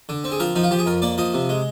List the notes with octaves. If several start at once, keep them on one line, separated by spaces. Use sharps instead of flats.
D3
C4
G#4
F3 A#4
F3 D#4
F4
F3 G4
G#4
F2 A#4
A#3 D5
F3 D#5
C3
G#3